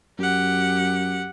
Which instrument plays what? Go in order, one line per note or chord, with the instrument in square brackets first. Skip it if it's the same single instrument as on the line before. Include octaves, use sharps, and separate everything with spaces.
[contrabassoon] F#2 [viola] G4 F#5